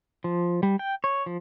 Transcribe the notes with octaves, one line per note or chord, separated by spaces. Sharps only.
F3
G3
G5
C#5
F3